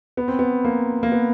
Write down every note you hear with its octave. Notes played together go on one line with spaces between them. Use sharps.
B3
C4
B3
A#3
A#3
B3